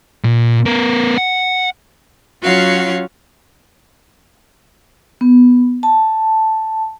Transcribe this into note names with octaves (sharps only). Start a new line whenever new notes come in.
A#2
B3 A#4
F#5
F#3 C#4 F4 F#4 C#5 F5
B3
A5